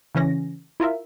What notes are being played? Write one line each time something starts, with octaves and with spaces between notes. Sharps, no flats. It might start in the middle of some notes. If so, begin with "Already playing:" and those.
C#3 E3 C#4 A#6
E4 F4 A#4 E5